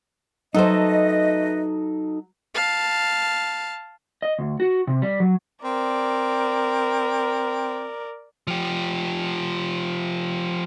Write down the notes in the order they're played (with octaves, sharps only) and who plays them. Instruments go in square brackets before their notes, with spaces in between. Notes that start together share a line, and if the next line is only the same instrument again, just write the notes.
[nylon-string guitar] F#3 C5 [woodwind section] A3 B4 D#5 [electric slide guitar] D#4 A4
[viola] F5 A5
[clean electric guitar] D#5
D2
F#4
C3
G3
F#3
[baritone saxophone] C4 [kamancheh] A#4 D5
[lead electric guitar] F3 G4